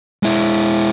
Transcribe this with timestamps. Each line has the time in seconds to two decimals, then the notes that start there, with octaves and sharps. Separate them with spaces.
0.23 G#3 E4